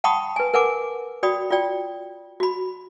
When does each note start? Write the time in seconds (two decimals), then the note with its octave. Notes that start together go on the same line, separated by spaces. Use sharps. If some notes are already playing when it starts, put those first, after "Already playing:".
0.04 F#5 G5 A5 B5 C#6 D#6
0.36 B4 G#5
0.54 A#4 B4 F#5 G#5 D6
1.23 F#4 D5 G5 B5 D#6
1.51 F4 F#4 D5 G5
2.40 F#4 B5